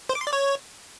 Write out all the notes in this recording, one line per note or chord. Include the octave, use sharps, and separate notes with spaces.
C5
D6
C6
D5
C#5